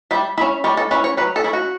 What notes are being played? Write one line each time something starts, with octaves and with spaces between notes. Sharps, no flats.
G3 E5
C#4 E4 E5
G3 C#5
A4
C#4 E4 B4
C#5
F#3 B4
A4
C#4 E4
F#4